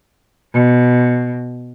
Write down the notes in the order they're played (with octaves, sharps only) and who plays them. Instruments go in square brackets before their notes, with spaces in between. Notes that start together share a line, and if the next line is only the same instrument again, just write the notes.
[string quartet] B2